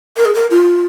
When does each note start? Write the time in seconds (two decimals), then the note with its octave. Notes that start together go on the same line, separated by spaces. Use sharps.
0.17 A#4
0.25 G#4
0.35 A#4
0.51 F4